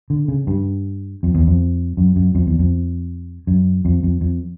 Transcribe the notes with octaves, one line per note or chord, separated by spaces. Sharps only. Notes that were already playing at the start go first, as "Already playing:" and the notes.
D3
C#3
G2
F2
E2
F2
F#2
F#2
F2
E2
F2
F#2
F2
F2
F2